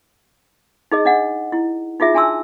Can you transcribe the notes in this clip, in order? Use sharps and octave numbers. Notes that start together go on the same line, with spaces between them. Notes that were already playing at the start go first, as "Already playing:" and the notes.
D#4 G#4 D#5
D4 D#5 F#5
E4
D#4 F4 G#4 E5
D4 G#5 A5 C6 E6